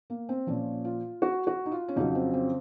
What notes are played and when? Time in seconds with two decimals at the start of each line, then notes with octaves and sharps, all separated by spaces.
0.10 A#3
0.29 C4
0.47 A#2 F3 C#4
0.84 F4
1.22 F#4
1.47 F#4
1.66 D#4
1.72 F4
1.88 C#4
1.96 F2 C#3 F#3 D#4
2.15 C4
2.34 C4